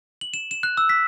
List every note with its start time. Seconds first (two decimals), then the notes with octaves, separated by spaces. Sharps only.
0.21 F#7
0.34 E7
0.51 E7
0.63 F#6
0.77 E6
0.89 B6